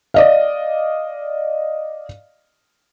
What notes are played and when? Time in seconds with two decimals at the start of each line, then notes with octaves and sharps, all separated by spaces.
0.14 D5 D#5 F5